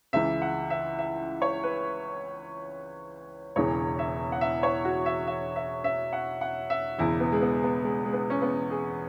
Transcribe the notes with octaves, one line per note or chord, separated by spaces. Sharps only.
C#2 C#3 E3 E5
F#5
E5
E5
C#5
B4
E1 E2 C#3 E3 C#5
E5
F#5
E5
C#5
F#4
E5
E5
E5
E5
F#5
F#5
E5
E1 E2 C#3 E4
B3
G#3
B3
B3
G#3
G#3
B3
C#4
B3
G#4